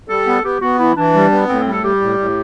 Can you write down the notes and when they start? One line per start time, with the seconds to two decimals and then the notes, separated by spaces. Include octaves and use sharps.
0.09 G3 A4
0.26 B3
0.44 B3 G4
0.61 B3 F#4
0.79 E3 E4
0.96 E3 D4
1.15 G3
1.32 B3
1.49 A2 C4
1.61 C4
1.66 G3
1.72 A4
1.83 G3 G4
2.01 A2
2.19 A2